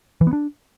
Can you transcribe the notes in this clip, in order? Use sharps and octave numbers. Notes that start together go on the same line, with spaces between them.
E3
B3
D4